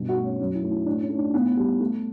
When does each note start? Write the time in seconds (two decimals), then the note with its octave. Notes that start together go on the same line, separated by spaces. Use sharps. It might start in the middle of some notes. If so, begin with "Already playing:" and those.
Already playing: G2 B2
0.09 F#4
0.16 A3
0.24 C#4
0.39 F#2 C#4
0.55 E4
0.63 A3
0.71 E4
0.86 A2 D4
1.02 C#4
1.10 A3
1.18 D4
1.33 A2 B3
1.57 G3
1.80 A3